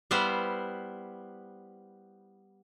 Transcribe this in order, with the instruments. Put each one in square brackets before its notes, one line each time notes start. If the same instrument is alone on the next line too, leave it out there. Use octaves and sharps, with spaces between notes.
[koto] G3 B3 E4 C5 F5